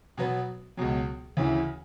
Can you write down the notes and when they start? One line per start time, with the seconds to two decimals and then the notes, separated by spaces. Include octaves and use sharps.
0.17 B2 F#3 B3
0.77 C#2 B2 F#3
1.37 D2 C#3 E3